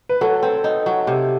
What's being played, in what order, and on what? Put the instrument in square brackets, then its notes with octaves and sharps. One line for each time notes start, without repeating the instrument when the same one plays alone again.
[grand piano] B4
[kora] F#3 [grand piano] A4
[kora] C4
D#4
F#3
C3